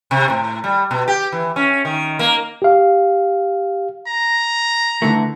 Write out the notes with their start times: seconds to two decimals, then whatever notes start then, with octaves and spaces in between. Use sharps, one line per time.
0.11 C3
0.30 A2
0.64 G3
0.91 B2
1.08 G4
1.32 E3
1.56 C#4
1.85 D#3
2.19 A#3
2.62 G4 F5
4.08 A#5
5.02 D3 E3 A3